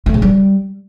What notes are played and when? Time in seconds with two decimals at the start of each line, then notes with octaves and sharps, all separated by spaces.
0.06 A3
0.14 C#3
0.22 G3